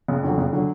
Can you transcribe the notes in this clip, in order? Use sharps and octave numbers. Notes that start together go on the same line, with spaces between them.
F#1
F2 D3 F#3
F#1
D3 F#3